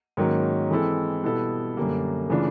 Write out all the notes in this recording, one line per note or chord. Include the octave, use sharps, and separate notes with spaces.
G#2 D#3 F#3 A#3 C#4
E3 G#3 C4 E4 A4
B2 G3 B3 E4 A4
F#2 D3 G3 A#3
C#3 E3 A3 D4 F4